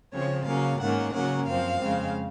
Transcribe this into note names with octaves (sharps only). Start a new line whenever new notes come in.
C#3 F3 C4 C#5
C#3 F#3 A#3 C#4 F5
G#2 D#3 A#3 C#4 F#5
C#3 F#3 A#3 C#4 F#5
F#2 F3 C4 F5
F2 C#3 G#3 C4